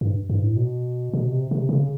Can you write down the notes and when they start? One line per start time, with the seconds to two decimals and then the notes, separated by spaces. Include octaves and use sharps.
0.01 G2
0.30 G2
0.44 A2
0.57 B2
1.13 B2
1.32 C3
1.51 C3
1.69 C#3